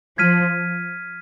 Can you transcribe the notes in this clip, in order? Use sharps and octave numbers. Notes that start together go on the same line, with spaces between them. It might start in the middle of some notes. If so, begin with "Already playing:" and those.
F3 F6 G#6 B6 D#7